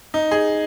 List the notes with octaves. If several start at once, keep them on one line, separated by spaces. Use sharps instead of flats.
D#4
G#4